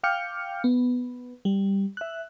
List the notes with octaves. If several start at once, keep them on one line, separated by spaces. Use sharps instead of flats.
F5 G5 D6 F6 G6 C#7
B3
G3
E5 F#6